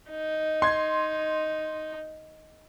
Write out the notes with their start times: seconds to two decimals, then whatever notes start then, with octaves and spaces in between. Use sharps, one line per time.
0.11 D#4
0.62 C6 G#6